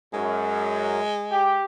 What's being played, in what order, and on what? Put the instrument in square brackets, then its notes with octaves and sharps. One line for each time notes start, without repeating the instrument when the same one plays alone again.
[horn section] F#2 [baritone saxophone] G#3
[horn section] G4